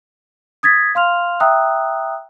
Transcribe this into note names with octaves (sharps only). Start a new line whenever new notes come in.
D#6 G#6 A6 B6
F5 C6 F6 F7
E5 G5 A#5 D#6 E6 F#6